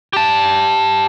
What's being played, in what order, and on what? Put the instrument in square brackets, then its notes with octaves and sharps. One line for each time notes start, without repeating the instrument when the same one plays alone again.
[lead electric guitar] G4 A5